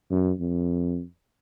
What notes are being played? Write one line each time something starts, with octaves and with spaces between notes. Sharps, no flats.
F#2
F2